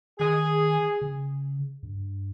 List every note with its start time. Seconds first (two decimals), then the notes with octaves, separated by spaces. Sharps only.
0.19 D#3 G#4
1.02 C#3
1.83 G2